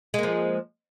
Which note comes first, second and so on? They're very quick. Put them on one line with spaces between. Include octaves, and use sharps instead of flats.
G#3 A#3 F3